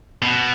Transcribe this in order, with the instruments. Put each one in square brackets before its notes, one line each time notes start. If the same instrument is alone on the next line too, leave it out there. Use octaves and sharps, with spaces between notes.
[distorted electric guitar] B2